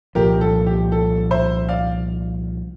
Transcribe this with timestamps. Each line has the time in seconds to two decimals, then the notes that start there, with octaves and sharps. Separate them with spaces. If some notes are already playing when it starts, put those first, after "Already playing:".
0.15 C2 A#2 F3 G4 A#4
0.41 A4
0.67 G4
0.92 A4
1.31 C5 E5
1.69 D5 F5